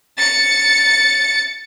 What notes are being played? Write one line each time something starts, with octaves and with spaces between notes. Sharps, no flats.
A6 C#7